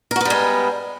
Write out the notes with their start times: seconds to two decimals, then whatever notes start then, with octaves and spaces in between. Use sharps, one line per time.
0.11 A#4
0.16 F#4
0.21 B3
0.25 G3
0.30 G#3